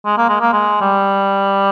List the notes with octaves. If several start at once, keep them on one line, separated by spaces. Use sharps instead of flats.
G#3
A#3
G#3
A#3
G#3
G3